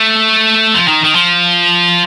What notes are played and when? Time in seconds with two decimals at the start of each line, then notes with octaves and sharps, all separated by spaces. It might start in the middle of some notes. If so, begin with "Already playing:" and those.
Already playing: A3
0.75 F3
0.88 D#3
1.04 D#3
1.15 F3